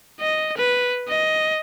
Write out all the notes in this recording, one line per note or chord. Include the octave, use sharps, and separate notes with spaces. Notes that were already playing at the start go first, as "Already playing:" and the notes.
D#5
B4
D#5